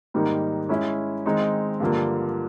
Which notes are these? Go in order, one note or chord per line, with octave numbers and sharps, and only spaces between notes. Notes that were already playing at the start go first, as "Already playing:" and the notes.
G#2 D#3 G3 A#3 D#4
G#3 C#4 E4
D#3 G#3 C4 D#4
G2 D3 F3 A#3